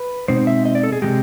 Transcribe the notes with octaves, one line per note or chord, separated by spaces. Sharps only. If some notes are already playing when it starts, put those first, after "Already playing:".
Already playing: B4
B2 G#3 C4 D#4 C5
E5
D#5
D5
A4
G#4
C3 F3 G#3 G4